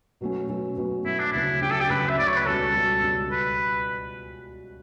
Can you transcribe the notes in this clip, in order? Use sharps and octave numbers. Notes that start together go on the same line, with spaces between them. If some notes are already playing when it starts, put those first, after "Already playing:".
B2 F#3 A3 C#4
B2 F#3 A3 C#4
B2 F#3 A3 C#4
B2 F#3 A3 C#4 E4
D4
D2 C#3 F#3 C#4 E4
D2 C#3 F#3 C#4 G4
A4
G4
D2 C#3 F#3 C#4 B4
E5
D2 C#3 F#3 C#4 D5
C#5
B4
C#2 B2 G3 C#4 F#4 A4
C#2 B2 G3 C#4 F#4
C#2 B2 G3 C#4 F#4
B4